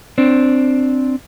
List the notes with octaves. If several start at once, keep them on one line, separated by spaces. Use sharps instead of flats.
C4 D4